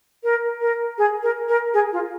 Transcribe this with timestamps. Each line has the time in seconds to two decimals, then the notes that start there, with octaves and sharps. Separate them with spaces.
0.23 A#4
0.61 A#4
0.98 G#4
1.23 A#4
1.48 A#4
1.74 G#4
1.92 F4